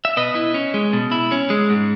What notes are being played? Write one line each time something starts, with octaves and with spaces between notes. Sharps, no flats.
E5
B2 B4 D#5
E4
C#4
G#3
B2
E4
C#4
G#3
G#2